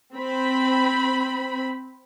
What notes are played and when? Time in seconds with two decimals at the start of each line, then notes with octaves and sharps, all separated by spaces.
0.13 C4 B5